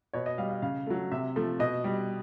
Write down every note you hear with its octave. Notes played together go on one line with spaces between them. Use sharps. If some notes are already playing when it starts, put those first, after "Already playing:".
B2 C#5
D#5
G3 F5
F5
C#3 F5
F#3 A3
C3 E5
F3 A3
B2 D#5
G3